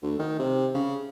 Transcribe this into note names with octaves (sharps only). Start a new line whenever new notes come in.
D2
D#3
C3
C#3